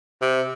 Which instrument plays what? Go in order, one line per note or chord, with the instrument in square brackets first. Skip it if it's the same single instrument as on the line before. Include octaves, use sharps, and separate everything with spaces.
[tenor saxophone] C3